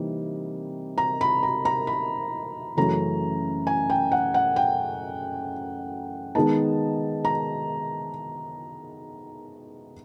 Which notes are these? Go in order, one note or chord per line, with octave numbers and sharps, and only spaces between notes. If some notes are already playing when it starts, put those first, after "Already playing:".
Already playing: C3 E3 G3 A#3 D#4
A#5
B5
A#5
A#5
B5
F#2 C#3 E3 A3 C#4 A#5
G#5
G5
F#5
F#5
G5
D#3 G#3 B3 D#4 A5
A#5